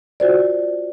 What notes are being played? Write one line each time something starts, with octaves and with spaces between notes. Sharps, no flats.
F4 F#4 C5 D5